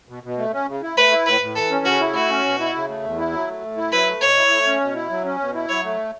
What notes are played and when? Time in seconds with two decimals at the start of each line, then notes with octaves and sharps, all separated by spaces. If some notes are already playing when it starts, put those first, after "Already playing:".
0.08 B2
0.23 B2
0.38 A3
0.53 C#4
0.68 C#3
0.82 E4
0.97 A3 B4
1.12 E4
1.26 A2 B4
1.41 A2
1.56 E3 A4
1.70 C#4
1.85 C#3 F#4
2.00 E4
2.15 A3 F#4
2.29 C#4
2.45 B2
2.59 E4
2.74 C#3
2.89 A3
3.04 E2
3.18 E4
3.33 F#3
3.48 A3
3.62 A2
3.77 E4
3.92 F#3 B4
4.07 A3
4.21 B2 C#5
4.37 E4
4.51 A3
4.66 C#4
4.81 B2
4.95 E4
5.10 F#3
5.25 C#4
5.39 B2
5.54 E4
5.69 F#3 C#5
5.83 A3